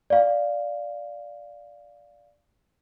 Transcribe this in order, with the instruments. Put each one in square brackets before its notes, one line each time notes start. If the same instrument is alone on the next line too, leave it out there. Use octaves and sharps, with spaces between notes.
[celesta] D5 F5